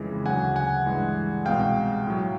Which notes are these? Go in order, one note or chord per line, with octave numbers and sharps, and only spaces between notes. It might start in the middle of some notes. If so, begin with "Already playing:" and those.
Already playing: F2 C#3 E3 G#3
D2 C#3 F#3 F#5 G#5
F#5 G#5
G2 E3 G#3
C2 B2 G#3 F5 G5
A2 F#3